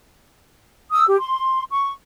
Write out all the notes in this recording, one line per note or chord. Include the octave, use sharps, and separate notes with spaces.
D#6 E6
G4
C6
C#6